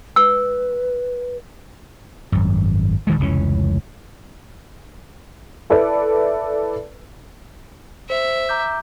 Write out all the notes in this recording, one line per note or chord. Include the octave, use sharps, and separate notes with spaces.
B4 E6
G#1 F#2
D1 D#3 G#3
F1 C#2 E3 C#4
E4 A4 B4 D5
C5 E5
A#5 D6 G6